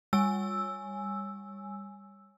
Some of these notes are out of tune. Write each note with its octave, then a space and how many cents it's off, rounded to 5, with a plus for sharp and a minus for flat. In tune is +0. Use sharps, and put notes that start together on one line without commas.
G3 +30 G#5 +0 E6 +0